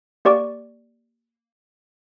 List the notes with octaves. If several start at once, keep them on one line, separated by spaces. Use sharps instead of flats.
A#3 G4 D5 C#6 D6